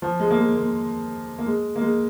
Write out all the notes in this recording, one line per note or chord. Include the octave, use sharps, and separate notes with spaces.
F3
G#3
A#3
G#3
A#3
A#3
G#3
A#3
G#3